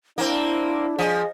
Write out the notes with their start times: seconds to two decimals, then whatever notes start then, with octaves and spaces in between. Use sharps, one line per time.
0.18 A#3 C4 D4 E4
0.99 F3 G#4 D#5